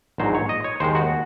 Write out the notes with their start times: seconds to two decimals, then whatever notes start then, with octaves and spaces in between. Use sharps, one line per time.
0.18 A#1 G#2 F#3 C5
0.35 C#5
0.49 D#5
0.64 C#5
0.80 D#2 D#3 G#3 C5
0.95 F#4